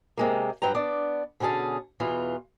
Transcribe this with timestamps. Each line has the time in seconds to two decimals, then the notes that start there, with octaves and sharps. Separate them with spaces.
0.17 C3 G#3 A#3
0.62 G2 F#3 B4 G5 A#5
0.75 B3 D4 D5
1.40 B2 D3 C#4 G#4 A5
2.00 E2 B2 E3 F4